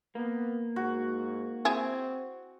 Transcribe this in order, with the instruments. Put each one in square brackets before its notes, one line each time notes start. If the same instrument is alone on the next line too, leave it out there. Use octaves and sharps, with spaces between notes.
[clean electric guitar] A#3 [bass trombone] B3
[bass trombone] G#2 [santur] F#4
[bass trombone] C4 [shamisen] E4 G#4